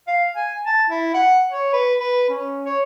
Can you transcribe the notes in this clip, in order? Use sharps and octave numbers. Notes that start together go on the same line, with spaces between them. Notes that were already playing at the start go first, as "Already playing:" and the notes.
F5
G#5
A5
E4
F#5
C#5
B4
B4
C#4
C#5